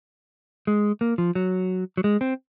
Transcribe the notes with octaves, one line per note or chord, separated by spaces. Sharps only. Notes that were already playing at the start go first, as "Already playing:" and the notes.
G#3
A#3
F3
F#3
F#3
G#3
C4